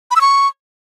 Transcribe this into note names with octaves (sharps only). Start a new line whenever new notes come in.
B5
E6
C#6